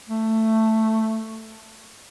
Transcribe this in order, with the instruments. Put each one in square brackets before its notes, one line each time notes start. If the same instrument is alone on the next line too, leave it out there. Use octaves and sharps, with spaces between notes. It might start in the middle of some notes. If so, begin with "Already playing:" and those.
[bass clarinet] A3